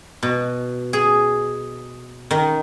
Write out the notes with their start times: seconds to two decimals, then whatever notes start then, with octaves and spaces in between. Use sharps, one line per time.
0.23 B2
0.93 G#4
2.31 D#3